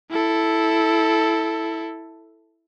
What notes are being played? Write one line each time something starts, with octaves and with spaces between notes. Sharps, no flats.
E4 A4